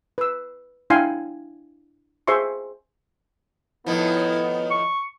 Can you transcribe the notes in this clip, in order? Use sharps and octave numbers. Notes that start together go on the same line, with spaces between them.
B4 E6
D4 E4 F5 G5 G#5 C6
G#4 C5 E5 C6 C#6
A2 D#3 F3 B3 E4
C#6